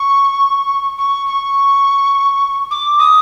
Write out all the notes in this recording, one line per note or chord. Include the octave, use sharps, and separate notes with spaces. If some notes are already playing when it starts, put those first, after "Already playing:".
Already playing: C#6
C#6
C#6
D6
D#6